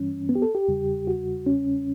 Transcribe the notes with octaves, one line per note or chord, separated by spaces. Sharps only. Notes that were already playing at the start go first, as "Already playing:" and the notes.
Already playing: G2 E3 G3 C#4
B3
G4
A4
G4
E2 C#3 G3
F#4
C#4